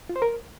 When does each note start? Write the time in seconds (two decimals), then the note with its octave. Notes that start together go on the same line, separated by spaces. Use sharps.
0.09 F4
0.16 C5
0.22 A#4